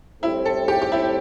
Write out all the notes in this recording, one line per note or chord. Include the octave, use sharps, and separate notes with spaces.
A2 G3 C4 E4
A4
G4
G4
E4